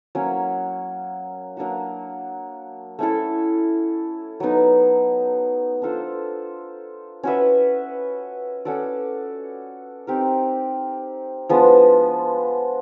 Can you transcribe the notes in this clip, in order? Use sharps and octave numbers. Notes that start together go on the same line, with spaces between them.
F#3 A#3 C#4
F#3 A#3 D4 F#4
A3 C#4 E4 A4
F#3 B3 D#4
D4 F4 A4 C5
C#4 F#4 B4 E5
C#4 F#4 A4 D5
C4 D#4 G4 A#4
F3 G#3 B3 D4